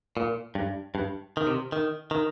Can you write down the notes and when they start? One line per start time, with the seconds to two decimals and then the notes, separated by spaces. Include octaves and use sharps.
0.17 A#2
0.55 G2
0.95 G2
1.37 D#3
1.47 C3
1.72 D#3
2.11 D#3